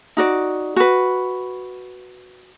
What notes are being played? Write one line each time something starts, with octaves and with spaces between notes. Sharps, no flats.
D#4 F#4 D5
F#4 B4